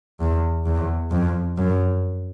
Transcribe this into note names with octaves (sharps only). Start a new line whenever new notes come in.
E2
E2
F2
F#2